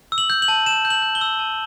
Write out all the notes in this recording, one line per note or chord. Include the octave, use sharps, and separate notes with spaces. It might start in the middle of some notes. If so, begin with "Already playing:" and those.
E6
F#7
G6
F#7
A5
A5 E7
G6
F#7
G6
G7
E6
A5